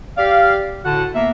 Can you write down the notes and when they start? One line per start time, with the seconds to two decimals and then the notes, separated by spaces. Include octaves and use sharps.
0.17 G4 D5 F5
0.85 A2 D3 F#4 F#5 A5
1.14 A#3 B3 E5